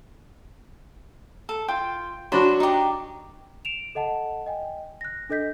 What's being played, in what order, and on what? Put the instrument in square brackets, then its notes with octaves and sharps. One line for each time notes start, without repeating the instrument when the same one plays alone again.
[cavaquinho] A4
[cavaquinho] F4 [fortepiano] G5
[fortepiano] F#3 D4 F#4 [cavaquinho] C5 B5
[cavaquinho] D#4 G4
[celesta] D7 E7 F7
A4 D#5 F#5 A5
D#5 G5 G#5
F#6 A#6
D4 A4 D#5 G6 B6